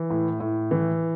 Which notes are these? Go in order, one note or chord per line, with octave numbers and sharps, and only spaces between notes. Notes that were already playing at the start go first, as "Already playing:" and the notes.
Already playing: E3
A2
A2
E3